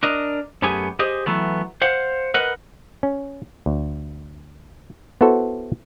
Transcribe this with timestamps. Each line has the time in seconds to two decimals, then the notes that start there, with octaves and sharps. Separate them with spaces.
0.03 D4 A#4 D#5
0.62 F#2 A3 B3 G4 G#4 G#5
0.99 G4 G#4 C5 D#5
1.26 E3 F#3 A3 B3
1.82 C5 F5 F#5
2.34 A#4 B4 D#5 F#5
3.03 C#4
3.66 D2
5.21 B3 E4 F#4 A4 C5